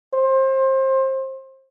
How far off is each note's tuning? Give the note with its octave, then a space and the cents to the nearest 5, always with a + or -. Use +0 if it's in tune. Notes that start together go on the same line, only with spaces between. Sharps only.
C5 +25